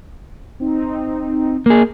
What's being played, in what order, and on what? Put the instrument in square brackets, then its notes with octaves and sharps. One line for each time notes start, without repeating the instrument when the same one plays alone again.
[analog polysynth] C4 D#4
[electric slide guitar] A#3 G#4